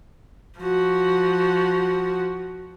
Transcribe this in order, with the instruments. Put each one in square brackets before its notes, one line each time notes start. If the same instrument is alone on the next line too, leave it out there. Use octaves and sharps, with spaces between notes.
[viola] F3 F#4